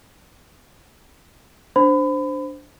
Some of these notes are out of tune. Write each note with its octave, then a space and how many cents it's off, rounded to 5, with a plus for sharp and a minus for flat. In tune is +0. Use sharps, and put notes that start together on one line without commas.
D4 +0 C5 -10 B5 +30